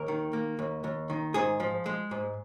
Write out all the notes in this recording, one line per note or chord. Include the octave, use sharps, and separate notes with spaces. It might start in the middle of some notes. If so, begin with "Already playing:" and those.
Already playing: D#2 A#4
D#3
A#3
D#2
D#2
D#3
G#2 G#4
F3
G#3
G#2